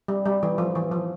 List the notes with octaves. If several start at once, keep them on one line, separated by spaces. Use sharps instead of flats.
G3
G3
E3
F3
E3
F3